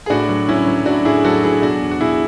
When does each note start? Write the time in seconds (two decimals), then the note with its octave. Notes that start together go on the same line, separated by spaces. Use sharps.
0.06 G#4
0.10 A2 D4 F#4
0.29 F#3
0.48 F#3 C#4 E4
0.67 F#3
0.86 A2 D4 F#4
1.05 A2 E4 G#4
1.24 F#3 F#4 A4
1.43 F#3 E4 G#4
1.62 B2 D4 F#4
1.82 E2
1.91 F#4
2.00 B2 E4 G#4